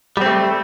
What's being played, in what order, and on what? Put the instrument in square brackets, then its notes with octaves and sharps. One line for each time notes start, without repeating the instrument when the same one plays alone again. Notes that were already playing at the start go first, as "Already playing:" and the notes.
[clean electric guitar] G3
C4
A3